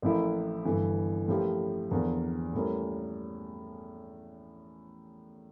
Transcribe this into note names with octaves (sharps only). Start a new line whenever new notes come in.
A1 A2 F3 A#3 E4
G1 G2 E3
A2 F3 A#3 C#4 G4
E2 D3 F3 A#3
A2 G3 A#3 C#4